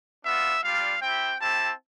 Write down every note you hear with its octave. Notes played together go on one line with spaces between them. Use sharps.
B3 D4 F4 E5
G3 D4 F4 F5
C4 E4 G4 G5
C4 E4 G4 A5